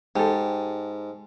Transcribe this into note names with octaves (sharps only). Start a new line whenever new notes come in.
G#2 G4 A4